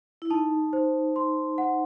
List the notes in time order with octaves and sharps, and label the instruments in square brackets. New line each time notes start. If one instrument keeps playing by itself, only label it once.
[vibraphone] E4
[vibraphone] D#4 [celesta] A5
[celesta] C5
C6
F#5